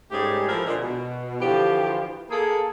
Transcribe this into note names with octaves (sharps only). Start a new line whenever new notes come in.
G#2 G3 A3 C#4 G4 G#4
E3 F3 A4 A#4
A#2 D3 G#3
B2
D3 E3 F3 F#4 G4
A#3 G#4 A4